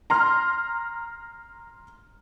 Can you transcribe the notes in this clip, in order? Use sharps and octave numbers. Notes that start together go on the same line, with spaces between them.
A#5 C6 F6